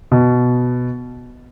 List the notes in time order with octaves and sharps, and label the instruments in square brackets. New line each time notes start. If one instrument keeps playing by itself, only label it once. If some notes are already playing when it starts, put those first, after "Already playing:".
[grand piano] B2